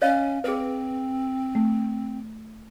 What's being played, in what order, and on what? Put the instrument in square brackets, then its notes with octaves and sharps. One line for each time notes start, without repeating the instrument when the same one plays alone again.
[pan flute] C#4 [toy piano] C#5 D#5 F5
[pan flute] C4 [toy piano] G#4 B4
[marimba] A3